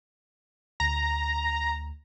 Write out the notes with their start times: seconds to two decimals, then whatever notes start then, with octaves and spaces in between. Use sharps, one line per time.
0.80 D2 A#5